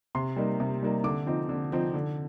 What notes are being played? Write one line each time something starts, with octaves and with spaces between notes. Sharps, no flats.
C3 C6
G3 A#3 D#4
C3
G3 A#3 D#4
D3 D6
F3 C4 D#4
D3
F3 C4 D#4
D3